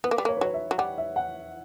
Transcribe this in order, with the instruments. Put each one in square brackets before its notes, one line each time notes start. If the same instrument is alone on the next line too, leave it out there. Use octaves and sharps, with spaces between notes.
[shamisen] B3 [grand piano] B4
[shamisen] A#3
G3
[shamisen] A#3 [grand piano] C#5
[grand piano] B4
[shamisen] F#3 [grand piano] C#5
[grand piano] E5
[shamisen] F#3
[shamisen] G3 [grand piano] F#5
[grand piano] E5
F#5